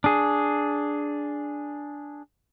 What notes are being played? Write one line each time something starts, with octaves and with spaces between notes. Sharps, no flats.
D4 G#4